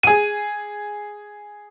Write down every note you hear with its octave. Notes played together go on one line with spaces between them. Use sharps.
G#4 D#7